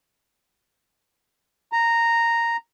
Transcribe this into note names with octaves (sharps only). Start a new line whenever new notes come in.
A#5